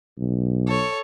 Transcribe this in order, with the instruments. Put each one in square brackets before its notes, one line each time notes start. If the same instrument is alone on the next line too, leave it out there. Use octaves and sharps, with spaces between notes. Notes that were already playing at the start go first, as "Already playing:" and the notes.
[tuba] B1
[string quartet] A4 C#5